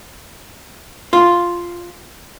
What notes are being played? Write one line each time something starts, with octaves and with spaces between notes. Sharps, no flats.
F4